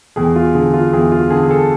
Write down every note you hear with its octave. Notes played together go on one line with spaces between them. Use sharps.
E2 G#4
F4
D3 G#4
F4
E2 G#4
F4
D3 G#4
G#4
A4